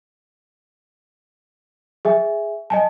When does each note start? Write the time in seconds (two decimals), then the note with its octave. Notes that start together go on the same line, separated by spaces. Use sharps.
2.05 G#4 E5 G#5
2.70 D#5 G#5 A5